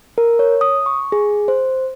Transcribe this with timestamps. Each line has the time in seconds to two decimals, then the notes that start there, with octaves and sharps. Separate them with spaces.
0.18 A#4
0.39 C#5
0.61 D#6
0.86 C#6
1.12 G#4
1.48 C5